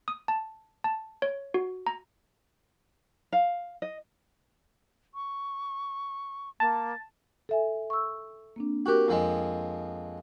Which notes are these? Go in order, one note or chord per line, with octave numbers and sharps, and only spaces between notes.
D#6
A5
A5
C#5
F#4
A#5
F5
D#5
C#6
A#3 A5
A4 E5 G#5
C#6 E6
A#3 C4 D4
F#4 G4 A#4 F#6
F2 F3 G#3